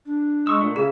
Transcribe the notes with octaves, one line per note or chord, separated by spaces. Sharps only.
D4
G#3 C#6 D#6 E6
A#2 A3
C#3 C#4 G#4 E5